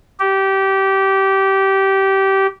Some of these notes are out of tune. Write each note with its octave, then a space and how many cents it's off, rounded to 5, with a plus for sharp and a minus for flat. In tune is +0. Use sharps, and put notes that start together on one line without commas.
G4 -20